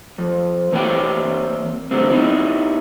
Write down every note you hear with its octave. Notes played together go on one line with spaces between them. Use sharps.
F2
E3 A#3 C4 C#5 G5
G2 D3 A3 C4
B3 D#4 E4